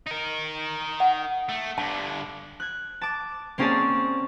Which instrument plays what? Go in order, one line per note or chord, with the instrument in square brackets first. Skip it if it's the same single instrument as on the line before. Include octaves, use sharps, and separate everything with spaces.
[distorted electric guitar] D#4 A#4
[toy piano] F#5
[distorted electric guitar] A3
[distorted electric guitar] G2 D3 [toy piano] A5
[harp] F#6 G#6
A5 D6
A#3 C4 C#4 G#4 D5 A5